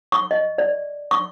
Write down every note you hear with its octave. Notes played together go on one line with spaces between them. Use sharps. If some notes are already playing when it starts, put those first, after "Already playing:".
C#6
D#5
D5
C#6